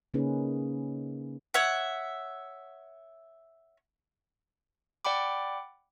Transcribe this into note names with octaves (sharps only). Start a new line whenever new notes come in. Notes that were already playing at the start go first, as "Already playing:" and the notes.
C#3 A#3 C#4 D#4 G#4 B4
C#5 E5 F#5
D5 F#5 G5 B5 D6